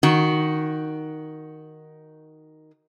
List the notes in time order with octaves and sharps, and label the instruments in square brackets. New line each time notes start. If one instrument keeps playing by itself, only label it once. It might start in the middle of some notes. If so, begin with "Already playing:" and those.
[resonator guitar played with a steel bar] D#3 F#4